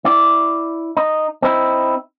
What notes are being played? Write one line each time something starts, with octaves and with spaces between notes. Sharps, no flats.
E4 D5
D#4
C4 D#4 E4